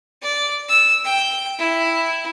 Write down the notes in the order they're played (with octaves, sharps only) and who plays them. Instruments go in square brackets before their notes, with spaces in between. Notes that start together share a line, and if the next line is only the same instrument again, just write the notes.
[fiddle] D5
E6
G5
E4